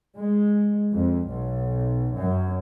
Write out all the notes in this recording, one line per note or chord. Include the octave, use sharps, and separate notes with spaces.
G#3
F2
B1
F#2